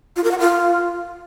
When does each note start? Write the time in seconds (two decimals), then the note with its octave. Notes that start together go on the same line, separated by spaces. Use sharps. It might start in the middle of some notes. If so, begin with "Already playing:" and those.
0.16 F4
0.24 A#4
0.31 F#5
0.39 F4